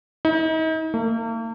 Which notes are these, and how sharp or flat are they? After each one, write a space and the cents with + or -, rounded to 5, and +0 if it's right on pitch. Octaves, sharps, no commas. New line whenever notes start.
D#4 +40
A#3 -45